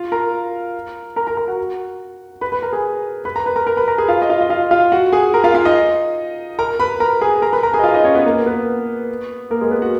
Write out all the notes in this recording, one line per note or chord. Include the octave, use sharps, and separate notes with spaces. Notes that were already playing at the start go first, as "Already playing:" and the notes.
Already playing: F4 F5
A#4 A#5
A#4 A#5
A#4 A#5
A#4 A#5
F#4 F#5
B4 B5
B4 B5
A#4 A#5
G#4 G#5
B4 B5
A#4 A#5
B4 B5
A#4 A#5
A#4 A#5
B4 B5
A#4 A#5
G#4 G#5
F4 F5
D#5
F4 F5
D#5
F4 F5
F4 F5
F#4 F#5
G#4 G#5
A#4 A#5
F4 F5
F4 F5
D#4 D#5
A#4 A#5
B4 B5
A#4 A#5
G#4 G#5
A#4 A#5
B4 B5
A#4 A#5
G#4 G#5
D#5
F4 F5
D#4 D#5
C#4 C#5
B3 B4
A#3 A#4
B3 B4
A#3 A#4
G#3 G#4
B3 B4
F#4 F#5